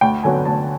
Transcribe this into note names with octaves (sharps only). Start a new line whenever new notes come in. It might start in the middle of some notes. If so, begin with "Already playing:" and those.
D2 G5
D3 F#3 B3 G#5
D2 A5